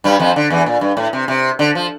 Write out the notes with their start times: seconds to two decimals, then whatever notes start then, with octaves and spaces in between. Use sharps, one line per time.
0.04 G2 G3
0.19 F2 F3
0.36 D3
0.50 E2 E3
0.66 A#2
0.81 G2
0.97 A2
1.13 C3
1.28 C3
1.59 D3
1.75 F3